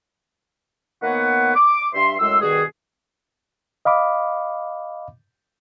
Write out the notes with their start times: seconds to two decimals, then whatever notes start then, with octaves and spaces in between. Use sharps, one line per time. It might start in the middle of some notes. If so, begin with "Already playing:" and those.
1.03 D#3 A#3 B3 B4 C#5 F#5
1.55 D6
1.94 G2 E5 C6
2.19 F#2 A2 G#3 C6 E6
2.41 G2 B2 D#3 F#4 G#4
3.85 D#5 F5 B5 D6